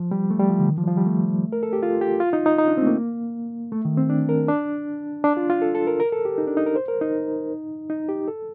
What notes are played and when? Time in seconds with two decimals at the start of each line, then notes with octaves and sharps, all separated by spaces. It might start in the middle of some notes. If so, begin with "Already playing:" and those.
Already playing: F3
0.11 G3
0.30 A3
0.40 G3
0.50 F3
0.59 D3
0.69 D#3
0.78 F3
0.83 G3
0.88 F3
0.97 G3
1.06 A3
1.53 A#4
1.63 A4
1.73 G4
1.83 F4
2.01 G4
2.20 F4
2.33 D#4
2.46 D#4
2.58 D#4
2.68 D4
2.77 C4
2.82 A3
2.87 A#3
3.72 A3
3.85 D#3
3.97 C4
4.10 D4
4.29 A#4
4.48 D4
5.24 D4
5.37 F4
5.50 F4
5.62 A4
5.75 A4
5.87 A#4
6.00 A#4
6.12 A4
6.25 G4
6.38 D#4
6.47 D4
6.57 D#4
6.66 A#4
6.76 C5
6.88 A#4
7.01 D#4
7.90 D#4
8.09 G4
8.28 A4